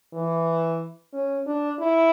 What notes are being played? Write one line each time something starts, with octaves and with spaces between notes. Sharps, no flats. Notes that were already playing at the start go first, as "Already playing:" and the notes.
E3
C#4
D4
E4